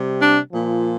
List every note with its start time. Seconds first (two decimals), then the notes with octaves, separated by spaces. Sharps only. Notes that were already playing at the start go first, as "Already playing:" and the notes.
Already playing: C3 G3
0.20 D4
0.51 A#2 F3